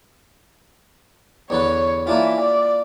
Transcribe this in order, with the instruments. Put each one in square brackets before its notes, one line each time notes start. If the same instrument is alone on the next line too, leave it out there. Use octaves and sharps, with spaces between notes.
[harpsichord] E2 D3 B4 [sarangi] C#5
[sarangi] E3 [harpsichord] A#3 D4 F4
[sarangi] D5